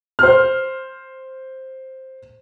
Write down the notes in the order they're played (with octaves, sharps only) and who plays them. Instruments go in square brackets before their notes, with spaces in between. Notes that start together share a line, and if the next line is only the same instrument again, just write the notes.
[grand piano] C5 F6